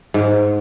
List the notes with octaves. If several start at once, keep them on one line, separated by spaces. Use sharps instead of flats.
G#2